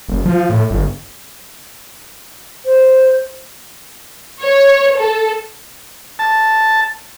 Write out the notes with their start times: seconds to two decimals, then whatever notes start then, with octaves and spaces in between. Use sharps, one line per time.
0.08 F#1
0.25 F3
0.49 A2
0.70 G1
2.66 C5
4.42 C#5
4.99 A4
6.19 A5